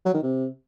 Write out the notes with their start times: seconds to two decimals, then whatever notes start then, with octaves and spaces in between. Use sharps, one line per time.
0.05 F#3
0.14 D#3
0.23 C3